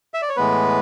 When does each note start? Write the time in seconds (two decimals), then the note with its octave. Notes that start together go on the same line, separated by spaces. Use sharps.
0.14 E5
0.22 D5
0.29 C#5
0.36 A2 E3 G#3 B3 B4